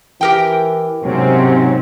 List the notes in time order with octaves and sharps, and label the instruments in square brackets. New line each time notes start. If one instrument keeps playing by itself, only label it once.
[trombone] E3 [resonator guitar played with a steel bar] G4 A#4 G5
[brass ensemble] G#2 C#4 [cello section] C3 C4 [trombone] F#3